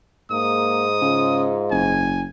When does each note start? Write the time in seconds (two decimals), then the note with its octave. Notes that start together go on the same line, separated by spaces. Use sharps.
0.31 G#2 A#3 D#6
1.02 C#3 F4
1.71 F#1 G#5